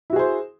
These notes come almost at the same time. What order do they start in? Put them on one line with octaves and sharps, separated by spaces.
E4 F#4 G#4 C5